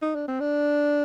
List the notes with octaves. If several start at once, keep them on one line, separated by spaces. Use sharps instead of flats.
D#4
D4
C4
D4